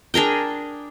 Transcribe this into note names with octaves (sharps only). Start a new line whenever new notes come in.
D4 G#4 A#4 G5